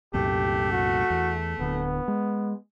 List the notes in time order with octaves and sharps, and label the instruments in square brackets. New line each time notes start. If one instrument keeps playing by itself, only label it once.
[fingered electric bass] C2 F#2 A#2 [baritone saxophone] A3 [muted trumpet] G4
[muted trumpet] F#4
[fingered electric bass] E2
[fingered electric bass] D1 D3 [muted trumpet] B3
[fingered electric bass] G#3